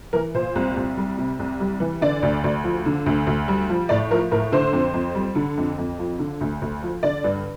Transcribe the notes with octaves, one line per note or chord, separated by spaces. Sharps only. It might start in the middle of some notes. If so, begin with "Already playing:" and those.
E3 A#4
A#2 C5
C2
C2
G3
C3
C2
G3
E3
D3 D5
D2
D2
F3
D3
D2
D2
G3
F3
A2 D5
F3 A#4
A2 A#4
D3 C5
F2
F2
G3
D3
F2
F2
F3
D3
D2
D2
F3
D3 D5
G2